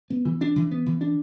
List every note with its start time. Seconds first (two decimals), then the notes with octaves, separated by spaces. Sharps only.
0.10 B3
0.25 E3
0.41 D4
0.56 E3
0.71 B3
0.86 E3
1.01 D4